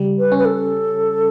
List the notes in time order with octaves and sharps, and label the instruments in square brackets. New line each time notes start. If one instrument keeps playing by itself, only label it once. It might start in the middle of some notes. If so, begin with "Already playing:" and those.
Already playing: [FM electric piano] C#3 G3
[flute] B4
[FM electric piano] C#4
[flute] B4
A4